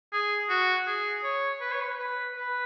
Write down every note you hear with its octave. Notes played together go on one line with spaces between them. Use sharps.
G#4
F#4
G#4
C#5
B4
C#5
B4
B4
B4